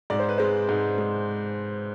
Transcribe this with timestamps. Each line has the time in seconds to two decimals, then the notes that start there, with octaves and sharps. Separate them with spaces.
0.10 G#2 D5
0.19 C5
0.29 B4
0.38 G#3 C5
0.69 G#2
0.98 G#3